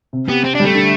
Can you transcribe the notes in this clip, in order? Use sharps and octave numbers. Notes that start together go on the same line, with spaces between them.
C3
B3 G4
C4 G4
D4
G3 A3
D3